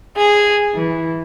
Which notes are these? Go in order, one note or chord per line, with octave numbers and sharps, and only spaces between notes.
G#4
E3